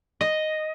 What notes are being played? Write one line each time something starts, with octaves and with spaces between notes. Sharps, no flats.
D#5